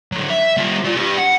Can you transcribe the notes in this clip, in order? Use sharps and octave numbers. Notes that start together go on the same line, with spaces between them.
D3 F#3
E5
G3 F4
F4 D5
G4 B4
F#5